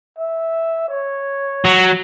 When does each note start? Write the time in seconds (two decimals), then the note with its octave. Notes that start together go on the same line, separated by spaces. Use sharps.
0.18 E5
0.88 C#5
1.65 F#3